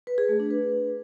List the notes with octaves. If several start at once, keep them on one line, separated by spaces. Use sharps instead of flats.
B4
G#4
A3
D4
B4